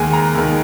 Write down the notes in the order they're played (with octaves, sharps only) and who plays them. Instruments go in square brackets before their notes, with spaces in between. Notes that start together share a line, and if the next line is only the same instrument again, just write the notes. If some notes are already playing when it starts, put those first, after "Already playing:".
Already playing: [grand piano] D#2 D#3 G#3 G#5
A#5
D#2 D#3 G#3